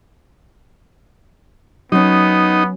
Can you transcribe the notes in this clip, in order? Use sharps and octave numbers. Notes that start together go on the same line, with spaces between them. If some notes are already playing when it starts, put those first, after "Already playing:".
F#3 B3 C#4 D#4